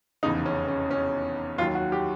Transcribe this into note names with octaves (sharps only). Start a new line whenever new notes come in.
F1 E2 C#3 D#4
C#4
C#4
C#4
D#2 D#3 F#3 F4
F#4
G4